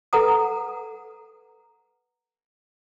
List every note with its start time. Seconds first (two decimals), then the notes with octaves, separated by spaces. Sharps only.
0.13 A4 B4 F#5 A#5 D#6